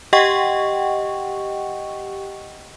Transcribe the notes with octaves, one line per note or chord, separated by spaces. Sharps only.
G4 D#5 F#5 G5 C#6